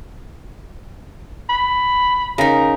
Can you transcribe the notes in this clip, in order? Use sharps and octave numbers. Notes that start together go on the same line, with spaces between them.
B5
C#3 D#4 A#4